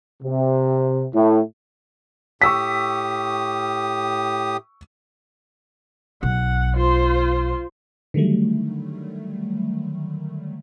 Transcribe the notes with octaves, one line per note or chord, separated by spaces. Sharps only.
C3
A2
A2 G4 C#6 D#6 E6 B6
B1 F#5
F4 C5
D3 D#3 F#3 G3 A3